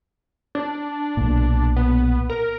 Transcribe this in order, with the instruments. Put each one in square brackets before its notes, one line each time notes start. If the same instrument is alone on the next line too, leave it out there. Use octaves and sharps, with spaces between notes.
[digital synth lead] D4
[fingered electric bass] B1 A#2
[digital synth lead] B3
A#4